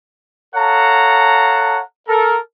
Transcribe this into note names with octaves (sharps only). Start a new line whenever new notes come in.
A4 C#5 F5 F#5 A5 A#5
A4 A#4